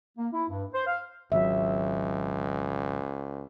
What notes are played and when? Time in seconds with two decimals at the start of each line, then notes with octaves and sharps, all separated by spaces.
0.18 A#3
0.33 E4
0.49 G2
0.74 C5
0.87 F5
1.32 G#1 C#2 F#3 E5